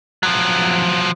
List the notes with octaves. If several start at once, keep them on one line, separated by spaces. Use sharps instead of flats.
F3 F#3